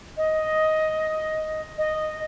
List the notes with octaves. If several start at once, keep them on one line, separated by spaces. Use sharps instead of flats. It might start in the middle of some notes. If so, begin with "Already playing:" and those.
D#5
D#5